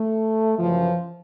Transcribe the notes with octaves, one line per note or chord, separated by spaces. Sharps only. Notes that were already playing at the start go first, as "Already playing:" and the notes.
Already playing: A3
F#2 C#3 E3 F3